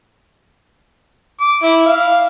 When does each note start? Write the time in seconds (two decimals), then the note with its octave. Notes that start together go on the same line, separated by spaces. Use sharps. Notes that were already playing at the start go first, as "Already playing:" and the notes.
1.41 D6
1.63 E4
1.86 F5